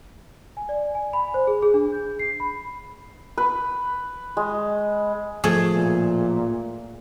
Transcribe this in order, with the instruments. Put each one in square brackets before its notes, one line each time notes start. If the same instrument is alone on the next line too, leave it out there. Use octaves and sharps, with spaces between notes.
[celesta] G#5
D5
G#5
B5
C5
G#4
G#4
D4
G6
C7
B5
[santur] B4
G#3
[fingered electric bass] A2 F3 [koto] A3 G#4
[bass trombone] A#2